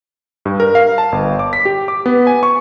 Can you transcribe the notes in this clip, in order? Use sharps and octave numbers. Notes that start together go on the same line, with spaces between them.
G2
A#4
F5
A5
G1
D6
B6
G4
D6
B3
G#5
C#6